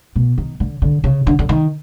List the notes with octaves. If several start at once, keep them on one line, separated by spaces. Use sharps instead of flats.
B2
D#3
D3
D3
C#3
D3
D3
D#3